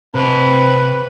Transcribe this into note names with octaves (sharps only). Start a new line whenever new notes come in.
C3 C4 B4 A5